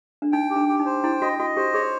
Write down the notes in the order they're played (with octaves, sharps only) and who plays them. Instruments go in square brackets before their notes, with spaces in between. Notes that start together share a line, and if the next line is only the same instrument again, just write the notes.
[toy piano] D4
[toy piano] D#4 [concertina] G5
[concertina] G4
[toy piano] D4
[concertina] G4
[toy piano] D#4
[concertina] C5
[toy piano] E4 [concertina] G5
[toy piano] F#4 [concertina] D#5
[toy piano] F#4 [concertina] D#5
[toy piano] G4 [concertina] C5
[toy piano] G#4 [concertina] C#5